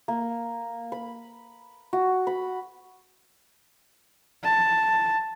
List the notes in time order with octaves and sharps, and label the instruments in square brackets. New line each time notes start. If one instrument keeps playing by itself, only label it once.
[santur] A#3
B5
F#4
B5
[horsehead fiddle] A5